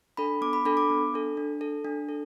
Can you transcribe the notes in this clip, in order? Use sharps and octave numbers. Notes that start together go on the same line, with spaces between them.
D4 A4 B5
B3 D6
B5
D4 A4 B5
D6
B3
D4 A4
D4
A4
D4
A4